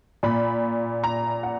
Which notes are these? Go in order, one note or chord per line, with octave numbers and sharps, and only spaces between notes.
A#2 B5
A#5
F#5